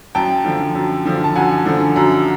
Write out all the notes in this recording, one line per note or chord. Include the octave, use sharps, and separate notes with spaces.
F#2 G5 A5
D3 F3
F#2
D3 F3
A5
F#2 F#5 G#5
D3 F3
F#2